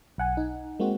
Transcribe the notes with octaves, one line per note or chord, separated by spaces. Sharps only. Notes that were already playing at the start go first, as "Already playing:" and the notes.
B1 F#5 G#5
D#4
G#3 A#3 C4 F#4